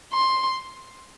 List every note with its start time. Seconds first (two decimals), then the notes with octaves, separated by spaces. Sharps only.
0.13 C6